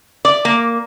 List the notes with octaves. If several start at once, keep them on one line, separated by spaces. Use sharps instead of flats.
D5
A#3